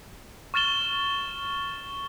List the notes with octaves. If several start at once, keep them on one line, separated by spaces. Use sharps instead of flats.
C#6 F6 A6 E7 G7